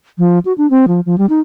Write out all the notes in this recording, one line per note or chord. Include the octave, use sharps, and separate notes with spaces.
F3
F#4
D4
C4
F3
F3
G3
D#4